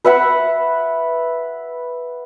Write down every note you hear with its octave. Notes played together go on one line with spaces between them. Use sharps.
B4 E5 F#5 B5